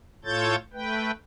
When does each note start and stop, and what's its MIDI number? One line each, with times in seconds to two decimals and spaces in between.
0.25 0.56 45
0.25 0.56 65
0.25 0.56 69
0.25 0.56 73
0.25 0.56 91
0.25 0.56 93
0.73 1.11 57
0.73 1.11 71
0.73 1.11 79